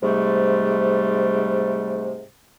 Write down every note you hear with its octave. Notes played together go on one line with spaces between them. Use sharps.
G#2 C3 G3 A3